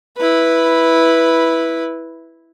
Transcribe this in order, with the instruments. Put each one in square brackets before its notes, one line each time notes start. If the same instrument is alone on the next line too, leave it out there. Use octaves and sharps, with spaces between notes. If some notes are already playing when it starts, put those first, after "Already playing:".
[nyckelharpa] E4 B4